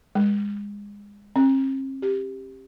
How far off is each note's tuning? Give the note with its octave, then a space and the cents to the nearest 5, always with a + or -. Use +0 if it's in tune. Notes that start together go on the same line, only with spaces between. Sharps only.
G#3 -30
C4 +45
G4 +5